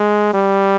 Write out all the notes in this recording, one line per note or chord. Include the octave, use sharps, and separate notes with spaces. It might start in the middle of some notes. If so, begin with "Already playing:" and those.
Already playing: G#3
G3